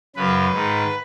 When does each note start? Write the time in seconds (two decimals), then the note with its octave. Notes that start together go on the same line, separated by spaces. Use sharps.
0.16 F#2 C#3 B4
0.53 G#2 D#3